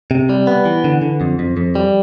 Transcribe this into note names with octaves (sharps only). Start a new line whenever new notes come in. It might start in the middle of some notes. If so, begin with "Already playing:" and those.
C3
G3
B3
E3
D3
D3
F2
F2
F2
G3